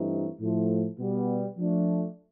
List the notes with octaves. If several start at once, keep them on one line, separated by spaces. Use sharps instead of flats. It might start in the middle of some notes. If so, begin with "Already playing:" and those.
Already playing: G2 E3 A3 C4 D#4
A2 F3 A3
B2 G3 B3
F3 A3 D4